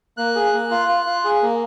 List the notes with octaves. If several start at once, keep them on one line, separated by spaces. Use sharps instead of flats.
A#3 F#6
G#4
A#3
F4
F4
F4
G#4
A#3